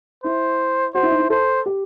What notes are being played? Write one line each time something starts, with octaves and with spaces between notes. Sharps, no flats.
E4 C5
F#4 C5
E4
D#4
E4
A4 C5
G4